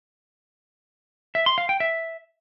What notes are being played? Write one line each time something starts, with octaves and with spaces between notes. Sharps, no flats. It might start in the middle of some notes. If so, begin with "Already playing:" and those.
E5
C6
F5
G5
E5